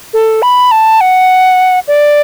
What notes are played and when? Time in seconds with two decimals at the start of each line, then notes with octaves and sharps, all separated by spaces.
0.14 A4
0.42 B5
0.71 A5
1.01 F#5
1.88 D5